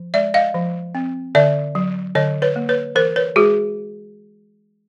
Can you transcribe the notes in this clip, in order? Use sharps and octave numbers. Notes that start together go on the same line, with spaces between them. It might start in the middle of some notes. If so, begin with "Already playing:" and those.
Already playing: F3
G#3 D5 E5
D#5 F5
F3
C4
D3 D5 E5
F#3
D3 C#5 D#5
B4 C#5
A#3
B4 C#5
E3 A#4 C5
B4 C#5
G#3 F#4 G#4